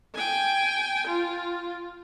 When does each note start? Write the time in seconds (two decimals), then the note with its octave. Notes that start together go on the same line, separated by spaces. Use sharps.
0.15 G5 G#5
1.07 F4